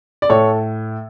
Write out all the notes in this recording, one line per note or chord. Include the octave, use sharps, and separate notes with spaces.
D5
A2 A4 C#5